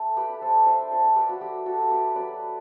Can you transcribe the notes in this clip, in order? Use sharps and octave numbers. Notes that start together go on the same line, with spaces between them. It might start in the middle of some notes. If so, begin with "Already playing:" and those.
Already playing: A3 D4 A4
G4 B4
D4
A4 C5
D4 C5 E5
A4 C5
D4
G4 B4
F#4
A3 G4
F#4 A4
A3
G4 B4
F#3 B4 D5